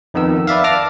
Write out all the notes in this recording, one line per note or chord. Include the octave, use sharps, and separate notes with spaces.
F2 D#3 B3 E6
B4 D5 E5 F5
A5 D6 F6 A#6